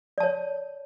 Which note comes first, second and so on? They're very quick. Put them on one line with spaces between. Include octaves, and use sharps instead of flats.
D5 A5 C#5